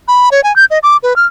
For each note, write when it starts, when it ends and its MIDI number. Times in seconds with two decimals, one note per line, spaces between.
0.08 0.29 83
0.31 0.43 73
0.44 0.55 80
0.56 0.65 91
0.71 0.79 75
0.83 0.97 86
1.03 1.16 71
1.16 1.26 89